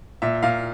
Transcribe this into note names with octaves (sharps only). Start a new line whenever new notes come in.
A#2 E5
A#2 F5